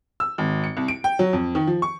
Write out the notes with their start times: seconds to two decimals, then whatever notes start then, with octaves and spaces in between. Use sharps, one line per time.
0.20 E6
0.38 G#1
0.64 C#7
0.77 C2
0.88 D7
1.04 G5
1.19 F#3
1.33 F2
1.55 D#3
1.67 F3
1.82 C#6